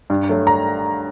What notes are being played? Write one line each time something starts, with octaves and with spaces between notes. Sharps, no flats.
G2
F#3 A3
A#5